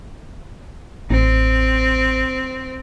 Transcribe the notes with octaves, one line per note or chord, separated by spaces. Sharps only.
A1 C4